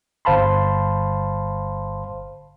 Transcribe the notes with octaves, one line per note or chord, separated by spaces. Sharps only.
G1 C5 F5 A5 B5 C6